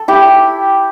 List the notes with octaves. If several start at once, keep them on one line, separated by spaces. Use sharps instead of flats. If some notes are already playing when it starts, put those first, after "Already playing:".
Already playing: A4
E4 G4